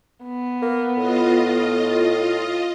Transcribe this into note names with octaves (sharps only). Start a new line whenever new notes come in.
B3
A#3
A2 F4 D#5